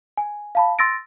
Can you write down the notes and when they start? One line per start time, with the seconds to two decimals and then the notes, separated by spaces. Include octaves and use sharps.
0.17 G#5
0.55 F5 A5 B5
0.79 C6 E6 A6 A#6 D7